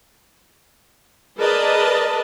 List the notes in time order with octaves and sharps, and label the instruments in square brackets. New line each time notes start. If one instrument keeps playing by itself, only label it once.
[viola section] G#4 A#4 B4 D5 D#5 A5